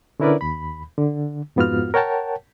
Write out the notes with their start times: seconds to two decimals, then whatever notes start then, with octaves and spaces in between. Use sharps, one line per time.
0.20 D3 C#4 E4 A#4 B4 D5
0.41 D#2 B5
0.98 D3
1.56 F2 G#2 B3 F4 F#4 F6
1.94 A#4 C#5 F#5 G5 A5